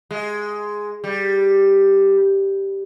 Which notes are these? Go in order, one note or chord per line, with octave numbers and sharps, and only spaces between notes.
G#3
G3